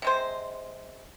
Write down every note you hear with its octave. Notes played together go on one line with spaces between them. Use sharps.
C3 G#3 C5